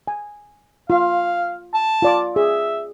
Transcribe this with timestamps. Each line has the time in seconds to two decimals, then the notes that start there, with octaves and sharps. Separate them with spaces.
0.08 G#5
0.90 F4 F5
1.74 A5
2.02 F4 D5 D6
2.36 G#4 E5